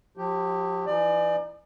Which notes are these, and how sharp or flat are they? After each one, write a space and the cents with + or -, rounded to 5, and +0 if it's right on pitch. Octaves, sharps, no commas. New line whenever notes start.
F3 +45 G4 +0
E3 +25 D#4 +0 D5 +30